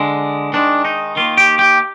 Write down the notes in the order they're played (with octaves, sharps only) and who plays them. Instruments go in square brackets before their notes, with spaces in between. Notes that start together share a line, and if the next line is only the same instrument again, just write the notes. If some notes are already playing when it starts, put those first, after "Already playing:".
Already playing: [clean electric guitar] D3 G#3
D#3 G#3 D4
D#4
D#3 A#3 F4
G4
G4